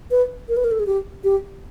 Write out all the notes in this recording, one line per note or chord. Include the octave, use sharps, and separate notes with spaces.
B4
A#4
B4
A#4
A4
G#4
G4
G4